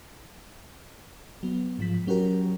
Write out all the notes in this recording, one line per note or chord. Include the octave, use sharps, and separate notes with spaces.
F#3 B3
G#2 F3 B6
F#3 C#4 F#4 G4 A#4